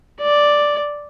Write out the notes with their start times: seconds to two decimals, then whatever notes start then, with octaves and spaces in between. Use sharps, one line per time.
0.21 D5